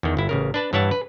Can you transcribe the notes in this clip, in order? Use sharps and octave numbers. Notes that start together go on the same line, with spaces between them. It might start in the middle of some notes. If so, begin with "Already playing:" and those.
E2 D#3
G1 E4
A1 C#3 A#4
D4 B4 A5
G2 E3 E4 C#5 F#5 A5
B4